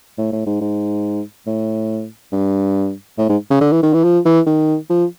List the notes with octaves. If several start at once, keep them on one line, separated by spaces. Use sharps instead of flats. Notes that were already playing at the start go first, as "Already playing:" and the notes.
A2
A2
G#2
G#2
A2
G2
A2
G#2
C#3
D3
E3
D#3
E3
F3
E3
D#3
F3